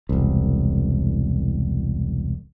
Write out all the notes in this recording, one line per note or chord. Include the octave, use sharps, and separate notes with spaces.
E1 C2